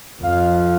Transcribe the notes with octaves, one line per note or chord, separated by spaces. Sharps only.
F2 F5